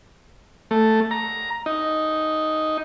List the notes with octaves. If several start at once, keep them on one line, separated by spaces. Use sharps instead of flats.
A3
A#5
D#4